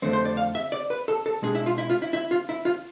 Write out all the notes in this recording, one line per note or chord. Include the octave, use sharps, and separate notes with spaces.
F2 D3 A3 C4
C5
D5
F5
E5
D5
B4
A4
A4
B2 G#3 D4 G#4
E4
F4
E4
F4
E4
E4
F4
E4
F4